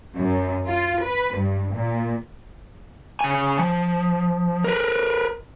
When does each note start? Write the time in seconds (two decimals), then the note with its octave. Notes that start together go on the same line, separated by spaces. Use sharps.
0.18 F#2
0.67 F4
1.02 B4
1.37 G2
1.76 A#2
3.21 C#3 G#5
3.59 F3
4.64 A#4 B4